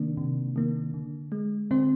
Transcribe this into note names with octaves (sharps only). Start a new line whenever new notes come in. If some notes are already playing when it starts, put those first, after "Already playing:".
Already playing: C3 D#3 A#3 D4
C3
D#3 A#3
D3
G#3
D3 C4 C5